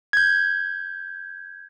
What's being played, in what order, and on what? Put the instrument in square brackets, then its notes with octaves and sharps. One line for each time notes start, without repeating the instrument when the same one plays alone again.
[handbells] G6 G#6